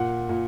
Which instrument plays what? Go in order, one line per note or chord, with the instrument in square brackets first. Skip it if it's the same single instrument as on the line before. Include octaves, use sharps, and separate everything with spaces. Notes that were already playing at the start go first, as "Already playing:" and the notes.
Already playing: [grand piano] A#2 F#5
A#2